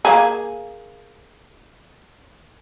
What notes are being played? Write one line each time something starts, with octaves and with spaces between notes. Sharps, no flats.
A#3 G#4